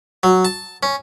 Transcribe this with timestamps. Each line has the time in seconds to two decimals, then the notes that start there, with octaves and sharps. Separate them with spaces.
0.23 F#3
0.45 A5
0.83 C#4